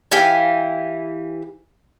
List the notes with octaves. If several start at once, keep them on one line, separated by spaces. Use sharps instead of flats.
E3 G4 F5 G#5